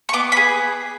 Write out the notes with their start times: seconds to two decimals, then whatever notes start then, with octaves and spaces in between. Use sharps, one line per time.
0.09 C#6
0.13 B3 D6
0.32 B5
0.37 G#4